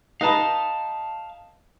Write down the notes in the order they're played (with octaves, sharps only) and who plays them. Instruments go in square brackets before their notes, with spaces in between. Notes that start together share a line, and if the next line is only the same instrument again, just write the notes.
[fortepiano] D#4 B4 A#5 [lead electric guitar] F5 A5